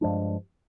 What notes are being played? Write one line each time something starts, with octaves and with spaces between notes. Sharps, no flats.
G2 F3 G#3 D4